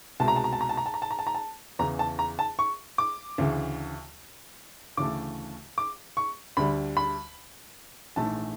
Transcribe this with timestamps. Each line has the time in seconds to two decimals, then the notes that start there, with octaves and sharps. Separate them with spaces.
0.20 C2 B2 G#3 A5
0.28 A#5
0.36 A5
0.44 A#5
0.53 A5
0.61 A#5
0.69 A5
0.77 A#5
0.86 A5
0.94 A#5
1.02 A5
1.11 A#5
1.19 A5
1.27 A#5
1.35 A5
1.79 E2 C#3 E3 A#5
1.99 A5
2.19 A#5
2.39 A5
2.59 C#6
2.98 D6
3.38 D2 C#3 E3
4.97 D2 C#3 E3 A3 D6
5.78 D6
6.17 C#6
6.57 D2 D3 G3 B5
6.97 B5
8.16 A#1 G#2 E3 A3 A5